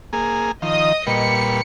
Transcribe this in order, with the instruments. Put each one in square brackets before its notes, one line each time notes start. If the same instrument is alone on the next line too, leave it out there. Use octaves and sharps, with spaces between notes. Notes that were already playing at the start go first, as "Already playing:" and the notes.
[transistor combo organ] A#3 G#4
[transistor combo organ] D#3 F3 [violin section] D#5 D#6
[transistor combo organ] A#2 G3 B4 [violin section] C#7